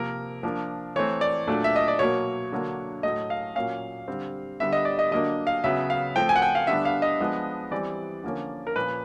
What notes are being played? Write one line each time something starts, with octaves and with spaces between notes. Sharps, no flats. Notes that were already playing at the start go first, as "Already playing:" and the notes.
Already playing: C3 F3 A#3 A#4
F3 A#3 D4
E3 A3 C4 C#5
D5
A#2 F#3 A3 D4
E5
D#5
D5
B2 F#3 A#3 C#5
D3 F#3 A#3 D4
A2 F#3 A3 D#5
F5
A#2 F#3 A#3 C#4 F5
D3 G3 C4
D3 G3 B3 E5
D#5
D5
D#5
D3 F#3 A#3 D4 D#5
F5
C#3 F#3 B3 E5
F5
F3 A3 C4 G5
G#5
F#5
G5
F5
D3 G3 B3 D4 E5
F5
D#5
F3 G#3 B3 D4
E3 G3 C4 D5
D3 F3 A#3 C#4
A#4
A#2 F3 A#3 C#4 B4